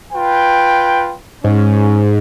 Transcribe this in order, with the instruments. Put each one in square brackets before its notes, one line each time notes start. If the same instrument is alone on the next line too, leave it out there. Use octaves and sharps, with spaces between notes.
[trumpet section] F4 B4 G5
[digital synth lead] G#2 [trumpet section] C#4